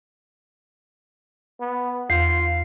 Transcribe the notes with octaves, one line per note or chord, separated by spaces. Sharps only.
B3
E2 F4 C7